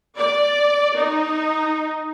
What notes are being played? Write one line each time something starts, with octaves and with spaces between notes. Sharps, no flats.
D5
D#4